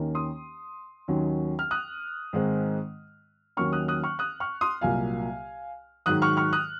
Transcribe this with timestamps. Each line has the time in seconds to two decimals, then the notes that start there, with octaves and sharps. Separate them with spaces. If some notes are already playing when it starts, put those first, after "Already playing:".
Already playing: D#2 D#3 A#3 C#4
0.15 C6 D#6
1.08 D#2 D#3 F#3 C#4
1.59 F6
1.71 D#6 F#6
2.33 G#2 D#3 G#3 C4
3.57 D#2 D#3 F#3 A#3 C#4 C#6 F6
3.73 D#6 F#6
3.88 D#6 F#6
4.04 C#6 F6
4.19 D#6 F#6
4.40 C#6 F6
4.61 C6 D#6
4.81 C2 A#2 F#3 A#3 F5 G#5
6.06 G#2 D#3 F#3 D#6 F#6
6.22 C#6 F6
6.37 C#6 F6
6.53 D#6 F#6